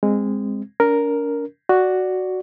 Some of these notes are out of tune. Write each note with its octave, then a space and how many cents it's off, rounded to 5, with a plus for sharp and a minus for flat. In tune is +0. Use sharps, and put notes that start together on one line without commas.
G#3 -15 C4 +0
D4 -45 A#4 +0
F#4 +0 D5 +0